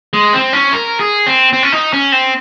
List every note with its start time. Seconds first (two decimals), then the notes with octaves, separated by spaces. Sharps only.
0.13 G#3
0.33 C4
0.53 C#4
0.73 A#4
1.00 G#4
1.27 C4
1.53 C4
1.63 C#4
1.72 D#4
1.93 C#4
2.12 C4